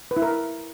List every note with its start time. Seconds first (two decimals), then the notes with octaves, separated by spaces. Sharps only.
0.11 B4
0.17 E4
0.22 A#4